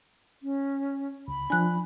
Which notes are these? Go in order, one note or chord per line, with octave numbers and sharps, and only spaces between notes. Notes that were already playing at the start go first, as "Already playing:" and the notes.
C#4
C#2 B5
F3 D4 G#5 F#6